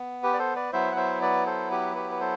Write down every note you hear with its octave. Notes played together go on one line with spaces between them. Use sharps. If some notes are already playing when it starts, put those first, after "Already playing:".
Already playing: B3
G4 B4
D5
A4 C5
B4 D5
F#3 B3 E4 C5 E5
F#5
C5 E5
B4 D5
A4 C5
G4 B4
G4 B4
B4
A4 C5